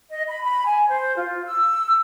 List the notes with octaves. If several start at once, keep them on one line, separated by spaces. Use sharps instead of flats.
D#5
B5
B5
G#5
C5
F4
E6